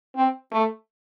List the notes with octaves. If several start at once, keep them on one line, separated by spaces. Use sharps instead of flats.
C4
A3